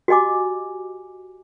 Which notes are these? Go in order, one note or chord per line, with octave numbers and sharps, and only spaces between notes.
F#4 G4 D#5 G#5 D6